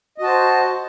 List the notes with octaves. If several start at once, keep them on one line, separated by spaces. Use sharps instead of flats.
F#4 C5 D#5 A5